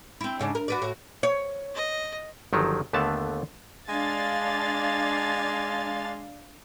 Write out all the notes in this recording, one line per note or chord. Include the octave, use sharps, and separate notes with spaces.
C4 E4
G#2 C#3 D4
A#4
F#4 B4 D5
A2 F#4
C#5
D#5
G1 D#3 F3 F#3
D#2 D3 A3 B3 A5
G#3 D4 F5 A6